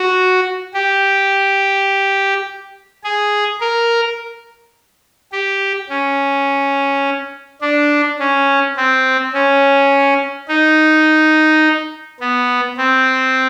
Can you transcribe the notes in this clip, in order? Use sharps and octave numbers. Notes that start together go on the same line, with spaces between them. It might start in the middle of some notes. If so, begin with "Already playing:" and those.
Already playing: F#4
G4
G#4
A#4
G4
C#4
D4
C#4
C4
C#4
D#4
B3
C4